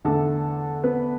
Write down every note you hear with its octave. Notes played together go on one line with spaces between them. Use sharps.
E2 D3 A3 D4 A4 A5
B3 B4